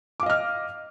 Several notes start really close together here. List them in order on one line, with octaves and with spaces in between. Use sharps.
D6 F5 D#5 F6